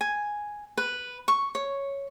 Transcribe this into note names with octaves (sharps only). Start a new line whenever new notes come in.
G#5
B4
C#6
C#5